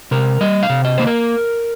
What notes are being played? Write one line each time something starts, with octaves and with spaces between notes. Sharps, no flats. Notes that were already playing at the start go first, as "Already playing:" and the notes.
C3 A#4
G3 D#5
F5
C3
D#5
A#3 C5
A#4